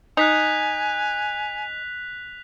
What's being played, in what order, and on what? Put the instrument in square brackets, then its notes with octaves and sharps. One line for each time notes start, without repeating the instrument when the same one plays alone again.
[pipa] D#4 [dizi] G#5 [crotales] F#6 B6 F7